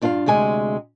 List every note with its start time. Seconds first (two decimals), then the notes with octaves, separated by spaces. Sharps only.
0.02 G2 D4 F4 A4 F5
0.26 D2 C3 G#3 G#5